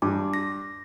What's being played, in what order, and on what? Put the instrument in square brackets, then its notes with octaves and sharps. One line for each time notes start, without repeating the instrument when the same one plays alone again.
[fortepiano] G2 [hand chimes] D6
[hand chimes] A#6